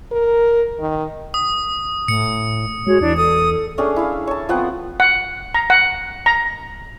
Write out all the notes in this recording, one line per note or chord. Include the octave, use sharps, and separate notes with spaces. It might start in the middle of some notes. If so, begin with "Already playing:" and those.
A#4
D#3
D#6
A2 C#7
G#3 F#4 C#5
E2 D4 E4
A4 D#6
A3 C#4 D4 G#4
E4 F5
C#5 A5
F3 B3 C4 F#5
F#5
A#5
F#5
A#5